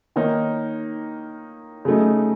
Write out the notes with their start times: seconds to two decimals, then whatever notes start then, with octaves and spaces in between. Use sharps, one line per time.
0.16 D#3 A#3 D#4 A#4 C#5
1.85 C#3 F#3 A3 D#4